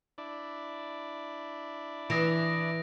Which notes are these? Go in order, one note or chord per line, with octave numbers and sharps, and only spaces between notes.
D4 E4 D5
E3 D#6 A#6 D7